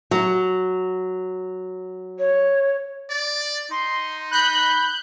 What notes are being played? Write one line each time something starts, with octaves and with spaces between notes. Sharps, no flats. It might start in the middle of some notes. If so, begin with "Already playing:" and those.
F#3
C#5
D5 A6
D#4 C6
B5 F#6 G6